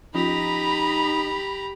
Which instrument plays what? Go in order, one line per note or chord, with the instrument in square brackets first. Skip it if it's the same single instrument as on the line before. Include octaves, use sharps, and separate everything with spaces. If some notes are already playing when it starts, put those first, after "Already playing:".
[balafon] F3 C#4 F4 [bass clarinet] D#4 [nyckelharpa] G4 A#5 [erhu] B5